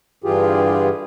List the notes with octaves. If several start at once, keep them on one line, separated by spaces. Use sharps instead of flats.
G2 D3 E3 F4 G4 G#4